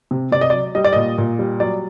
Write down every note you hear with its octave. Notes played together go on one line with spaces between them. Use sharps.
C3
C3 D5
D#5
D5
F#3
G3 D#5
D5
A#2 D#5
A#2
G3
F#3 D5